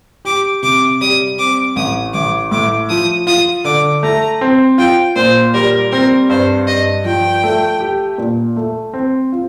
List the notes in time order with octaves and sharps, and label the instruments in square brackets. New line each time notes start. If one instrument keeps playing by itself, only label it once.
[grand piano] G4 [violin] D6
[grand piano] C3 [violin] D6
[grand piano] G3 [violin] D#6
[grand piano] C4 [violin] D6
[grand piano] A1 [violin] D#6
[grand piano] A1 [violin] D6
[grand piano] A2 [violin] D6
[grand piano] F3 [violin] D#6
[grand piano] F4 [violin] D#6
[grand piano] D3 [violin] D6
[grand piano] A3 [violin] A#5
[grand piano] C4
[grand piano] F4 [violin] G5
[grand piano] A#2 [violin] C5
[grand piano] G3 [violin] A#4
[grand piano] C4 [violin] A#4
[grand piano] G2 [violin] C5
[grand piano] G2 [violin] D#5
[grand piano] F3 [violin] G5
[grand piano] A3
G4
A#2
A3
C4
F4